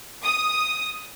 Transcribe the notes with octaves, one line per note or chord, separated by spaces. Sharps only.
D#6